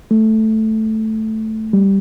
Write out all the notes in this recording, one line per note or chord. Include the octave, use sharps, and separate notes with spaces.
A3
G3